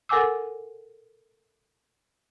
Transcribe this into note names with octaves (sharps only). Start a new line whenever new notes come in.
A4 A#4 F#5 G#5 D6 E6